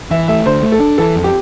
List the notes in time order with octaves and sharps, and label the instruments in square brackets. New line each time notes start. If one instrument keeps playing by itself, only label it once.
[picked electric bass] E3 [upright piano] E5
[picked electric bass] A3 [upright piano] E5
[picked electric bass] D3 [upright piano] C5
[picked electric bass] A3
[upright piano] A4
[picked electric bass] D4
[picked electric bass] E3 [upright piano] A4
[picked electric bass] F2
[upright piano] G4